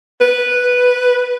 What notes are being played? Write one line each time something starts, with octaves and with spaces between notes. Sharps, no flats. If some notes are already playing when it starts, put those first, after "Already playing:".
B4